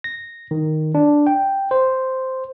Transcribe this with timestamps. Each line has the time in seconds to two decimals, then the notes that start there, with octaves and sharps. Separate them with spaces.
0.04 A#6
0.51 D#3
0.95 D4
1.27 G5
1.71 C5